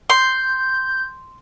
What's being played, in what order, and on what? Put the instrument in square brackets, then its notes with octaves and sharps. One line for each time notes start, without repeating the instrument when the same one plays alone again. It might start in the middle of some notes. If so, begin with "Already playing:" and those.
[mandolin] C6 [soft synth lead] G6